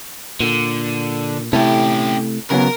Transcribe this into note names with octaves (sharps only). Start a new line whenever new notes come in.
A#2 D3
C3 A3 C#4 E4 G4 A4
C#3 F#3 B3 A#4